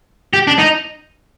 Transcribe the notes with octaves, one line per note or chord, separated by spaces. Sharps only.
G4
D4
D#4